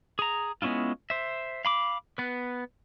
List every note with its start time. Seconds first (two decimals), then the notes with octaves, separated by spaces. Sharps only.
0.19 G#4 A#5
0.62 G#3 B3 C#4 E4 F4
1.10 C5 E5
1.65 F5 B5 D6
2.18 B3 B4